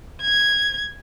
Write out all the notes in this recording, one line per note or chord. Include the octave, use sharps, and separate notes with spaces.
G#6